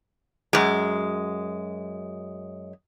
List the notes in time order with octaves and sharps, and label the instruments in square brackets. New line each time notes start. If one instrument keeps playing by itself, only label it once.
[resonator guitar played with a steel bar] F#2 G#3